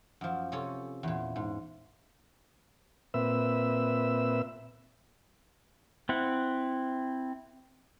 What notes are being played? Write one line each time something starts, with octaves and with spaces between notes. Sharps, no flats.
F#2 F3
C3 C#4 A4 C#5
E2 A#2
G#2
A#2 C4 B4 E5 E6
C4 E4 F#5